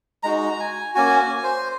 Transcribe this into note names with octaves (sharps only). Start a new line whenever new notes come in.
G#3 D#4 F#4 A#5
G#5
A#3 C#4 F#4 G#5
G#5
C5